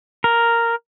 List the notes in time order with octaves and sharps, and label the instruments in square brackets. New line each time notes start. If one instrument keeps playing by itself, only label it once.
[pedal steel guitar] A#4